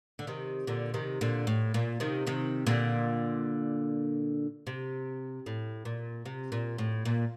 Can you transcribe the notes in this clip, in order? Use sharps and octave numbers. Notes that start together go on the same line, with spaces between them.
D3
C3 D#3
A#2 D3
C3 D#3
A#2 D3
A2
A#2
C3 D#3
C3 D#3
A#2 D3
C3
A2
A#2
C3
A#2
A2
A#2